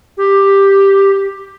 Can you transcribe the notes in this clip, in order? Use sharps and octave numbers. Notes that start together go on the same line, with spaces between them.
G4